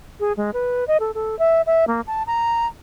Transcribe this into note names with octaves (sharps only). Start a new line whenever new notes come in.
G#4
G#3
B4
D#5
A4
A4
E5
E5
A#3
A5
A#5